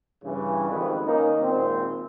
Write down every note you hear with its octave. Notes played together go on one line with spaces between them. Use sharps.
G2 C#3 E3
G#1 F2 G#2 D#3 B3 B4
D#3 A#3 C#4 D#4
G#1 A#2 C4